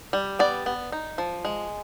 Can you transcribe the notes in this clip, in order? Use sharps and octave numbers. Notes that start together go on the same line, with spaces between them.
G3
B3 D5
B3
D#4
F3
G#3